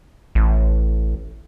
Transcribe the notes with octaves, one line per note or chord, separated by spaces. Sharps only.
A1